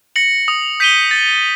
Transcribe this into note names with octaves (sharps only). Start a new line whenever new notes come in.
A#6 C#7 F#7
D#6
G6 B6 D#7 G7
A6